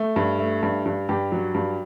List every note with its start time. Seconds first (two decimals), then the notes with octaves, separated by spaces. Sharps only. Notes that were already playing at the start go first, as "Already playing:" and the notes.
Already playing: A3
0.16 G2
0.39 A3
0.63 G2
0.86 G2
1.09 G2 G4
1.32 F#3
1.54 G2